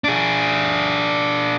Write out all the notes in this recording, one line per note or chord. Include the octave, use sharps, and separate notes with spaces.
D4 G#4